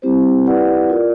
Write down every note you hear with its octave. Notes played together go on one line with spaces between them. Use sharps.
G3 C4 E4 G4 C5
E4 G4 B4 D5 F#5
F4 A#4 D5